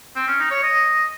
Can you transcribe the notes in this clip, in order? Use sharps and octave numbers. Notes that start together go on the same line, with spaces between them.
C4
C#4
D#4
C#5
D#5